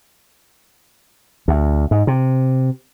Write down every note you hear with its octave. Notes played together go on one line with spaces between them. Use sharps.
D2
G#2
C3